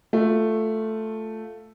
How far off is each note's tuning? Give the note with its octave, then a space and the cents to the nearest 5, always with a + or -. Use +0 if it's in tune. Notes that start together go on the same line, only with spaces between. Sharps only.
A3 +0 F4 +10